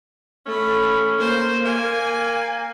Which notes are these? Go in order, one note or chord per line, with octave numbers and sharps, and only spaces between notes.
A3 C#4 B5
A#3 C5
A#3 G#5